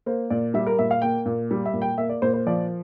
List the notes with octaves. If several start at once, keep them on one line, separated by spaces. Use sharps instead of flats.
A#3 C5
A#2 D5
G3 E5
A#4
A#2 E5
F5
A#3 G5
A#2
G3
E5
A#2
G5
A#3 E5
D5
A#2 C5
C5
F3 D5